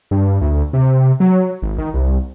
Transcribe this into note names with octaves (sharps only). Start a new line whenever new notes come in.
G2
D2
C3
F#3
G#1
D#3
C2